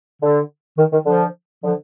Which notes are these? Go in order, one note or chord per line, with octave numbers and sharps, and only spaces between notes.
D3
D#3
D#3
D3 F3
D3 F3